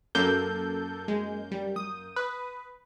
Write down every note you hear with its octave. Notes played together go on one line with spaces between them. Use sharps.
F#2 A#3 A4 G6
G#3
G3
D#6
B4